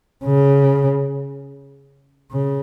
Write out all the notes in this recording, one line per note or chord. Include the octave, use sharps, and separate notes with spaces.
C#3
C#3